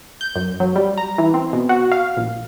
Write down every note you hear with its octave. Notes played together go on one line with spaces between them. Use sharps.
G6
F#2
F#3
G3
A#5
E3
C4
B2
F#4
F5
A#1